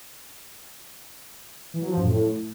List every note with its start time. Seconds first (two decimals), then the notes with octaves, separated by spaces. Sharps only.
1.74 E3
1.82 F#3
1.89 F3
1.97 F#2
2.05 A2